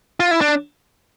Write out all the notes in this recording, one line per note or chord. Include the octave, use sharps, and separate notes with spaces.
F4
E4
D4